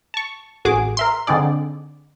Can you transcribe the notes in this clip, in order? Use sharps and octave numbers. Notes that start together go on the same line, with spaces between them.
A5 C#6
A1 F#4 G#4 D6
A#4 E5 C6
D3 C4 D#4 G#4 D5